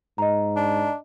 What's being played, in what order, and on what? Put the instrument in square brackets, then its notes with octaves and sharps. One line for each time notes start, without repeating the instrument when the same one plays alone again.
[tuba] G#2 [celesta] D#5 A#5
[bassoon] D4